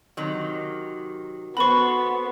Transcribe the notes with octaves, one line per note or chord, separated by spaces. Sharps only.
C3 D#3 F#3
B3 F#4 A4 C5 B5 C#6